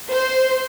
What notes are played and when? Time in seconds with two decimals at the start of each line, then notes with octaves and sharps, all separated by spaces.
0.10 C5